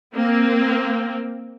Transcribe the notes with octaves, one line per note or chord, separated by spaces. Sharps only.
A#3 C4